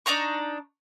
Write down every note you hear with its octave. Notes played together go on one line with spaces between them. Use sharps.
D4 D#4 A#5 C#6